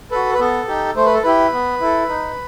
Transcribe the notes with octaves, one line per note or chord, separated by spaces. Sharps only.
F#4 A4 B4
B4
B3 A4
D#4 G4
A3 C5
B4
A4
E4 G4 B4
B3
E4 A4
D#4